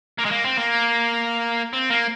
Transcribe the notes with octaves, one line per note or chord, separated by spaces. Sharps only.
A#3
G#3
A#3
C4
A#3
C4
A#3